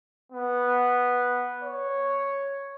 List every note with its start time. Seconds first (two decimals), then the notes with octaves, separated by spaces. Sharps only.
0.32 B3
1.63 C#5